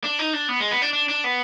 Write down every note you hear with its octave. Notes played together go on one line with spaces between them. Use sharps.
D4
D#4
D4
B3
G#3
B3
D4
D4
D4
B3